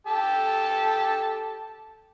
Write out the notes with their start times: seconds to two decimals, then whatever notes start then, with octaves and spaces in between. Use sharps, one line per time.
0.07 G4 A4 A5